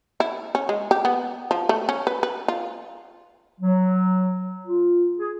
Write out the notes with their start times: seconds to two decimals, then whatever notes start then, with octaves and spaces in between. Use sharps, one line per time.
0.20 E4
0.55 C#4
0.69 G#3
0.91 G4
1.05 B3
1.51 F3
1.69 A3
1.89 C#4
2.07 B4
2.23 B4
2.48 F4
3.61 F#3
4.67 F4
5.19 G#4